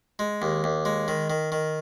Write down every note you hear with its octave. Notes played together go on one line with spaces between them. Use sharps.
G#3
D#2
D#2
G#3
D#3
D#3
D#3